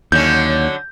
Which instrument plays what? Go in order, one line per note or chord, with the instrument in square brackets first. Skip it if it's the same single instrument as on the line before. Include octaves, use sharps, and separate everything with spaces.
[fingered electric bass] D#2 [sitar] D3 F#3 C#4 [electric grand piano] G6